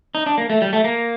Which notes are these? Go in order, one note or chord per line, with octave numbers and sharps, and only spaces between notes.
D#4
D4
A#3
A3
G3
A3
A#3